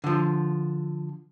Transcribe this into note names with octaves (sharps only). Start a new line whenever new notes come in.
D3 F3